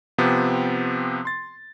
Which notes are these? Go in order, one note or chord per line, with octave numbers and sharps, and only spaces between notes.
C3 F3 B3 C4 G4
C6 A6